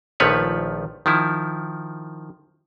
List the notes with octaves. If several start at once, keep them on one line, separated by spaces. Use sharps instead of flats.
A#1 D#3 F3 A3 B4 C#5
D#3 F3 E4